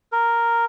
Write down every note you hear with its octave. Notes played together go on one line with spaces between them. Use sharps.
A#4